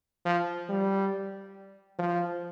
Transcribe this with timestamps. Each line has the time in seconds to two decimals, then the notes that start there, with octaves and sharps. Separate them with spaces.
0.25 F3
0.69 G3
1.99 F3